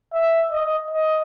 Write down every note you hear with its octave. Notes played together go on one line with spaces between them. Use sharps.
E5
D#5
D#5